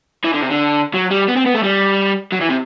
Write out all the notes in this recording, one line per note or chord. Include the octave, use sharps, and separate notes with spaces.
E3
D3
C3
D3
F#3
G3
B3
C4
B3
A3
G3
F#3
E3
C3